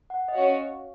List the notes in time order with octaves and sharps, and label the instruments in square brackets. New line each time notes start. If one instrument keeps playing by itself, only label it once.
[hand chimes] F#5
D#5
[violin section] C#4 F#4 C#5 [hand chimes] F5